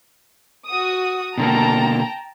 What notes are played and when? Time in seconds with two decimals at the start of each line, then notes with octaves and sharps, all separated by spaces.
0.67 F#4 D#6
1.38 B2 D3 A#3 G5 A5 A#5